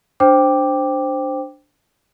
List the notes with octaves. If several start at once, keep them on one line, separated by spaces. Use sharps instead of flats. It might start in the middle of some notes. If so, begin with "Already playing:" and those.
D4 C5 G5 D6